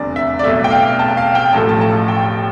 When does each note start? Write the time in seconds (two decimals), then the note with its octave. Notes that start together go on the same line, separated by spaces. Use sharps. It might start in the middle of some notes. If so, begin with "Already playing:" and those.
Already playing: F1 E2 D3 G3 D5
0.16 E5
0.39 D5
0.43 B1 B2 A3 E5
0.64 G5
0.71 F5
0.99 A5
1.17 F5
1.35 G5
1.53 A1 A2 F3 A3 A5
1.69 A5
1.81 A5
2.08 G5